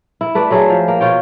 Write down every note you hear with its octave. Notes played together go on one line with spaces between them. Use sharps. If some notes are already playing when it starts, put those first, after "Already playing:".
E4
A3 B4 D5
F#3 A3 G#4
F3
A#3
B2 F4 C#5 G5